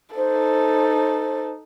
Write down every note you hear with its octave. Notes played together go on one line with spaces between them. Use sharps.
D#4 A4 C5